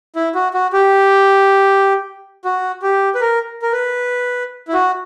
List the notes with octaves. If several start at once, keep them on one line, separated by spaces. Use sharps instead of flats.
E4
F#4
F#4
G4
F#4
G4
B4
A#4
A#4
B4
E4
F#4